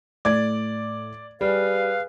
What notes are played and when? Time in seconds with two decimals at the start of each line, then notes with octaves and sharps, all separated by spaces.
0.25 A2 D5 G#6 A6
1.41 G3 G#4 B4 D5 F5